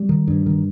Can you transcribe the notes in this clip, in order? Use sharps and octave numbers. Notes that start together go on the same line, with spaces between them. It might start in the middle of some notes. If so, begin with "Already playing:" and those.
Already playing: G3
D#3
G2
D#3